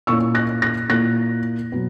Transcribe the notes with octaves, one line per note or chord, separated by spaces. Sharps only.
A#2 A#3 C#4 E4 C#6 E6
F#6 A#6
F#6 A#6
A#2 A#3 E4 F#6 A#6
B2 F#3 B3